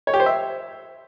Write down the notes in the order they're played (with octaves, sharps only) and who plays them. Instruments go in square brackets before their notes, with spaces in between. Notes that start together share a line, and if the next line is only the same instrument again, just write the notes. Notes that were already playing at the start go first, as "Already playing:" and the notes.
[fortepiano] C#5
G4
C5
E5